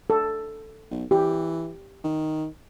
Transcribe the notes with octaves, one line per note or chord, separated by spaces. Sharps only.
A4
B1
E3 G4
D#3